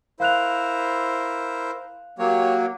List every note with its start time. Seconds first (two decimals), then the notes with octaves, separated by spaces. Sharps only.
0.20 E4 A#4 C5 F5 F#6 F7
2.19 F#3 A#3 G4 C#5